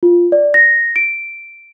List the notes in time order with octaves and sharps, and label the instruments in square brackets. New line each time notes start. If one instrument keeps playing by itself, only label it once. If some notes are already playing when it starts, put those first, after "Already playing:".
[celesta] F4
D5
A#6
D7